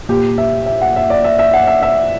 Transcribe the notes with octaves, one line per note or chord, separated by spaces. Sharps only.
A#2 G4
E5
E5
F#5
E5
D5
E5
E5
F#5
E5
E5